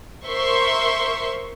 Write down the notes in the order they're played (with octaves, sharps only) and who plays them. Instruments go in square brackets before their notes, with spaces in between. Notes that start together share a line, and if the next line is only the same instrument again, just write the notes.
[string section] A#4 C5 E5 C6 C#6